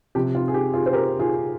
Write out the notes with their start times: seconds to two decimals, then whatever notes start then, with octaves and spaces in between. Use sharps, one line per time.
0.15 C3 F3 G4
0.35 F4
0.48 G#4
0.54 G4
0.74 F4 G#4
0.86 C5
0.93 G4 A#4
1.20 F4 G#4